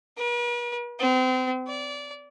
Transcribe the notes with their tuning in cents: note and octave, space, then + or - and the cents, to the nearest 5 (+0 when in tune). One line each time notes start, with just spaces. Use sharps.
B4 -45
C4 -35
D5 -25